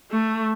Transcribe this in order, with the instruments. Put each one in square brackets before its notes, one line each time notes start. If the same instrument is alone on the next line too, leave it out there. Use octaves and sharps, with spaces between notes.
[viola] A3